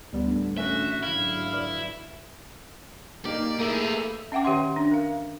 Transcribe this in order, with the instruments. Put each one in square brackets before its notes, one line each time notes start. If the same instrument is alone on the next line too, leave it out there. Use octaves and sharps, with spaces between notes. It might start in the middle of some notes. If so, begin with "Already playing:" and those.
[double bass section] A1 D3 D#3 [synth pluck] D2 G3 B3
[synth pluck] A3 C#4 [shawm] F#4 [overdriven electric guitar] E5
[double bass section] G#2 D3 F#3 [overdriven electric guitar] E4 [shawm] F5
[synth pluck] B4 D5
[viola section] A#3 [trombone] D#4 [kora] G4 [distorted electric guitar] D5
[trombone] A3 [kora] A#3 [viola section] E4 D#5 E5 [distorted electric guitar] G#4 B4
[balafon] C#4 E5 F#5 G5 D6
D#3 G4 C#5 E5 F#5 C6
D4
A#4 F5